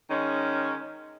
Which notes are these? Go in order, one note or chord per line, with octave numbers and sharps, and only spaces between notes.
D#3 G#3 C#4